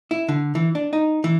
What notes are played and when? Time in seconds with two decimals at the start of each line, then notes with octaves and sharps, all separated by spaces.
0.11 E4
0.29 D3
0.55 E3
0.75 D4
0.93 D#4
1.24 E3